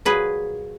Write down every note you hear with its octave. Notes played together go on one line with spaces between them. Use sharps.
A#2 F#3 G#4 B4